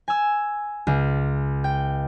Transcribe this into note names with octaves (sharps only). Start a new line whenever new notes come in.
G#5 E6
C#2
G5